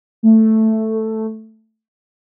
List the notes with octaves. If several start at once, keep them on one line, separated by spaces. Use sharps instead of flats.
A3